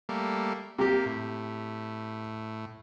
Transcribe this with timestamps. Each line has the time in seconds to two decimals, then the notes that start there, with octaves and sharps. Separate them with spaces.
0.09 G3 A3 A#3
0.79 C3 A#3 G4
1.06 A2